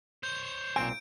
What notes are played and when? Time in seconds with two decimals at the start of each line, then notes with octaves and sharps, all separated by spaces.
0.23 C5 C#5 G6
0.76 B1 A#2 C4 G#5 D7